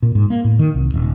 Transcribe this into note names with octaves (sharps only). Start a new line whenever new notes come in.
A#2
G#2
A#3
A2
D#3
C2
D#1